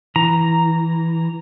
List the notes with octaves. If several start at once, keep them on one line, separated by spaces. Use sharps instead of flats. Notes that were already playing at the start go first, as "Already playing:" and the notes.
E3 A#5